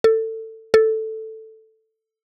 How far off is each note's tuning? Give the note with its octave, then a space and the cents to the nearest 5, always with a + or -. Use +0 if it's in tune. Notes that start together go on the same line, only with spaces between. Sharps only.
A4 +20
A4 +5